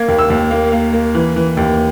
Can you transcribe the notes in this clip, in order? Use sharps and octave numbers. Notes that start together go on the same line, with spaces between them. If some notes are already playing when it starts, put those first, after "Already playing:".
Already playing: A#3 G#6
D#2
E6
D#2
A#3
A#3
A#3
E3
E3
D#2